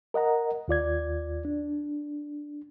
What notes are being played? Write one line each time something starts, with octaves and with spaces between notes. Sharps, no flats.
A#4 D#5 F#5 A#5
D#2 F4 D5 G#6
D4